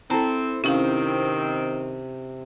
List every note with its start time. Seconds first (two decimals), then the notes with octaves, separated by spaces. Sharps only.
0.10 C4 E4 A4 A5 A#5
0.64 C3 D#3 C4 C#4 E4 F5